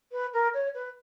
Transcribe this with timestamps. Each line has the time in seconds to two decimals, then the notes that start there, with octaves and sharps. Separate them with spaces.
0.11 B4
0.33 A#4
0.53 C#5
0.74 B4